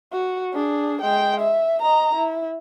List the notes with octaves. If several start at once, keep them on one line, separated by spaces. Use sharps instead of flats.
F#4
D4 G#4
G#3 G5
E5
D#5 A#5
E4